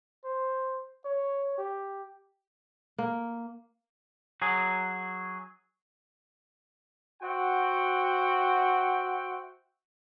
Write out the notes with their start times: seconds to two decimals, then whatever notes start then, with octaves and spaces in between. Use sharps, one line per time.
0.25 C5
1.05 C#5
1.58 G4
2.98 A#3
4.42 F#3 G#4
7.22 F#4 C5 E5 F#5 G5